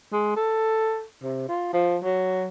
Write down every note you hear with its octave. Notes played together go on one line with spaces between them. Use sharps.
G#3
A4
C3
F4
F3
F#3